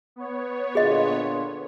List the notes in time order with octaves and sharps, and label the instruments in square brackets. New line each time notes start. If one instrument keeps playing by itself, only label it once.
[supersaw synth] B3 C#5
[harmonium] A#2 D3 F4 [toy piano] G#4 D#5